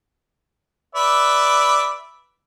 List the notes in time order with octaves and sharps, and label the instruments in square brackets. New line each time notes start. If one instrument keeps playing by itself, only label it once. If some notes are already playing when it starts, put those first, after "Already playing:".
[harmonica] B4 D5 E5